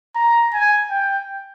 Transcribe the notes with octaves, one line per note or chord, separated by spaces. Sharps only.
A#5
G#5
G5